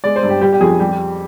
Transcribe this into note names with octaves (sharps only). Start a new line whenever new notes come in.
G#3 D5
C5
G2
G4
G3 G4
G4
F2 G#4
G3 G4